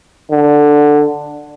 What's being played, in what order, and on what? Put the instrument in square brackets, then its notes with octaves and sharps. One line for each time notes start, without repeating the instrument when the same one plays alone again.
[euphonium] D3